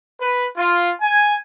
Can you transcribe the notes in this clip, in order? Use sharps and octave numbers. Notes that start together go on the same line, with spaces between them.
B4
F4
G#5